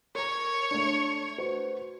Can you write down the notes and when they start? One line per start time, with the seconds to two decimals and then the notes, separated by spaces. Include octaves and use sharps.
0.15 A#4 C#5 A#5
0.71 A3 D4
1.38 F#4 B4 C5